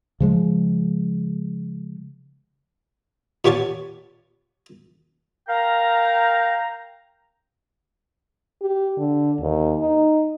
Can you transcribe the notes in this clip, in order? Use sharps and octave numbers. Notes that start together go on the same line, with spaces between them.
C#3 F3 G#3
A#2 B3 G4 C#5 F5 A5
A#4 F5 G5 A#5
G4
D3
D#2
D#4